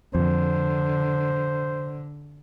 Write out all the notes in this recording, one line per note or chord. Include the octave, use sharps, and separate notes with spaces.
F2 D3 C5